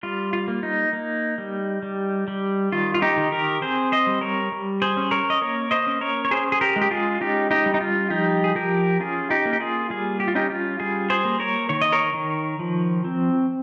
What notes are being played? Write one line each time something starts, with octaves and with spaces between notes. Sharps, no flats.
G3 F4
F4
A#3
D#4
A#3
G3
G3
G3
D#3 F4
F4
D#4 G4
D#3
G4 A#4
C4 G#4 C5
C5 D#5
G3
A#4 C#5
G3
G#4 C5
C#4
A#4 C#5
D#5
A#3 A#4 C#5
C5 D#5
C#4
A#4 C#5
C#5
C#4 G#4 C5
G#4
G4 A#4
G#3
G4
F4 G#4
C#4 D#4 G4
D#4 G4
G3
D#4
F4
F3 D#4 G4
G#4
F3 G4 A#4
C#4 F4 G#4
D#4 G4
A#3
G4
F4 G#4
G3 F4 G#4
G4
F4
C#4 D#4 G4
F4
G3 F4 G#4
G#4 C5
A#3
A#4 C#5
D#3 C#5
D#5
A#4 C#5
D#3
F3
C4